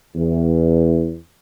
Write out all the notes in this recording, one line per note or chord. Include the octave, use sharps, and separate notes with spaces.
E2